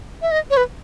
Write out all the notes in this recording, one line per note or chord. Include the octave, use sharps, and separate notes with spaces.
E5
D#5
C#5
B4